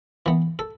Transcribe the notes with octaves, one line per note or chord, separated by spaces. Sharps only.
E3 B3
A4